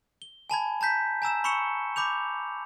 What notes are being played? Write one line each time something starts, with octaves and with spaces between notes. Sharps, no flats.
G7
G#5 A5 B5 G#6
A5 A#5 G6 B6
G#5 A#5 E6 E7
B5 C#6 E6 C#7 E7 G7
B5 D6 G6 F7